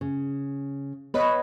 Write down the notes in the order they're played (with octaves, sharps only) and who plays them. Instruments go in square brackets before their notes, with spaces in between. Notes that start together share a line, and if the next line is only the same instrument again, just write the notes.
[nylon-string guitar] C#3
[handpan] B3 C#5 D#5 [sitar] B4